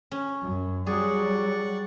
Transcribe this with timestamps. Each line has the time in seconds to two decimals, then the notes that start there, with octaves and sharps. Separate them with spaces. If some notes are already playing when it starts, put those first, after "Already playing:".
0.11 C#4
0.42 F#2
0.86 F#3 G3 G#4 D5 F#5 C#6